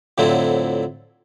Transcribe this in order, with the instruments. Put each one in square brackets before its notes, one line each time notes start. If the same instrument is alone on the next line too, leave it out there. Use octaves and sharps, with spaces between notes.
[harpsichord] F2 A2 D3 F#3 C4 E4